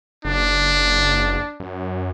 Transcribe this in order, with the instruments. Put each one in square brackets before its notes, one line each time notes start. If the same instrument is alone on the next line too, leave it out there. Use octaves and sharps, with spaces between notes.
[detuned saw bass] F#1 [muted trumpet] D4
[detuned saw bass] F#2